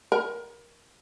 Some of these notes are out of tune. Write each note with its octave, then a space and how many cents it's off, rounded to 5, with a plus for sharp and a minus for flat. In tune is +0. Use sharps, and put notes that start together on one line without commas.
A#4 +20